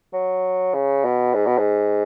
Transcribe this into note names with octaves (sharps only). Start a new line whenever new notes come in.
F#3
C#3
B2
G#2
B2
G#2